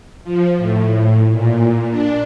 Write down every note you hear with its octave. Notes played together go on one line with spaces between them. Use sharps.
F3
A2
A#2
D4